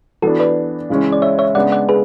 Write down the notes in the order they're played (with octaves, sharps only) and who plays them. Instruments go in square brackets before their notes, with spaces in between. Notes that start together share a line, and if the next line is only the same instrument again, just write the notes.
[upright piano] E3 B3 D4 [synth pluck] F#4 A4
[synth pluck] B4 D5
[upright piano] C#3 E3 G#3 C#4
[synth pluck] D5
C#5 E5
C#5 E5
[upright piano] C#3 G#3 B3 D4 [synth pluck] D5 F#5
[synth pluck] D5 F#5
G#4 B4